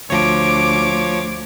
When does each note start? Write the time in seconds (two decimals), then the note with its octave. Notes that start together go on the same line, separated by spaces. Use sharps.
0.10 D2 F3 C#5 D6